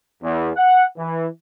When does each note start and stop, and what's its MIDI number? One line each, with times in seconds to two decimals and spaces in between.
0.22 0.50 40
0.55 0.85 78
0.97 1.26 52